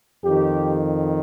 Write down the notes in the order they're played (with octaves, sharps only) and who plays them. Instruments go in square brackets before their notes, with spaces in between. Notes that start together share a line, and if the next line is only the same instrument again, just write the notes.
[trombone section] F2 D#3 G4